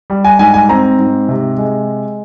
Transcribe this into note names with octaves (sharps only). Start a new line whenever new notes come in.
G3
G#5
G#2 G#5
G#5
C4 A#5
G#2
C3
G#3